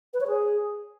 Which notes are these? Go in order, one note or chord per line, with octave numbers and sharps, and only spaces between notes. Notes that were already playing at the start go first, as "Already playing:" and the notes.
B4
C#5
G#4